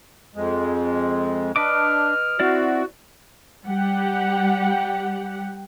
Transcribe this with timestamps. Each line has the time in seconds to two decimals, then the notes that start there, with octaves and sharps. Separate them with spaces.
0.35 F2 G#3
1.56 D4 B4 D#5 D6 F6
2.40 C4 E4 F#4 D5
3.66 G3 G4 F#5